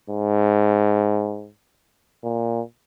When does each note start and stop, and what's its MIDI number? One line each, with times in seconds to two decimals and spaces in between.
0.10 1.49 44
2.23 2.61 46